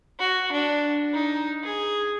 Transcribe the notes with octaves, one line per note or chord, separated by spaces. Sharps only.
F#4
D4
D#4
G#4